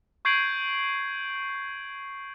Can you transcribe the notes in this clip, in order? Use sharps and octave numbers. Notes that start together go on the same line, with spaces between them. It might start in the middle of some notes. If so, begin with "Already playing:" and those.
C#6 G6 G#6 C7 D7 F#7